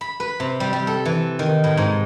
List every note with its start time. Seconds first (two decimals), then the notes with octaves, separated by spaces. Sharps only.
0.01 B5
0.20 B4
0.40 C3
0.60 G3
0.73 G3
0.87 A4
1.05 E3
1.39 D#3
1.64 A2
1.77 G#2